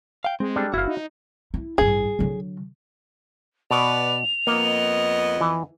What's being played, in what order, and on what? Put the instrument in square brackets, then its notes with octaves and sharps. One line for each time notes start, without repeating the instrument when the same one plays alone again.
[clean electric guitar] F5 G5
[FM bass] G#3 [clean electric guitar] C4
[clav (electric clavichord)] G3 D4 A4
[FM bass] F#1 [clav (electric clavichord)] E4 F5 [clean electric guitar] F#4
[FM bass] D#4
[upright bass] E4
[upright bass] A1 G2 [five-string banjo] G#4
[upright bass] D3 F#3
[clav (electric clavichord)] B2 [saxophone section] B3 B4 D5 [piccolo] F7
[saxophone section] F2 B3 D#5 [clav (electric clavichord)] A#3
[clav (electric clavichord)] E3